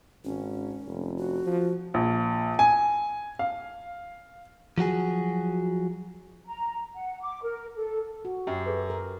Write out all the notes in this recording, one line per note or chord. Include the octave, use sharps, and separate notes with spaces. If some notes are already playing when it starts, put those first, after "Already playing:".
G#1 C#4
F1
F#4
F3
A#1
G#5
F5
F3 F#3 F#4 G#4
A#5
F#5
D6
A#4
A4
F#4
F#2 G4
G#4 A4 B4
A#4